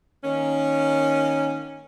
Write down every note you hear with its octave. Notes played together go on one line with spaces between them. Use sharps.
D#3 A#3 C#4